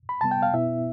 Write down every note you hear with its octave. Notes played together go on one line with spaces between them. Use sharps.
B5
C3 G3 B3 A5
G5
F5
B2 B3 E4 E5